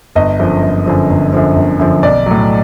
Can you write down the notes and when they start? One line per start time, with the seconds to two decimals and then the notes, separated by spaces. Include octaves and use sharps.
0.15 G1 D#5
0.39 F#2 D3 F3
0.63 G1
0.86 F#2 D3 F3
1.09 G1
1.33 F#2 D3 F3
1.56 G1
1.79 F#2 D3 F3
2.03 B1 D5
2.26 A2 F#3